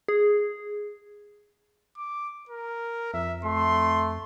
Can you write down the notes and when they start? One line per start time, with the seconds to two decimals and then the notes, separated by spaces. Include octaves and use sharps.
0.08 G#4
1.97 D6
2.49 A#4
3.14 F2 E5
3.45 A3 C6